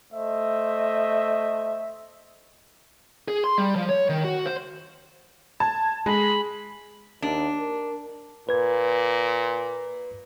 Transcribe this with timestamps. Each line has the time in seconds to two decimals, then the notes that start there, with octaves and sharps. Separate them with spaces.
0.13 A3 C5 D#5 E5
3.28 G#4
3.44 C6
3.58 G3
3.75 F3
3.89 C#5
4.09 D#3
4.24 F#4
4.46 C5
5.60 A5 G#6
6.06 G#3 G#4 B5
7.22 D#2 D4
7.60 A#4
8.49 A#2 B4 G#6